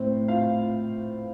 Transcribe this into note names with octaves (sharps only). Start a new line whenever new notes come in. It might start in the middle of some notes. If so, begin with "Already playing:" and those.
Already playing: A2 C4 C5
F4 F5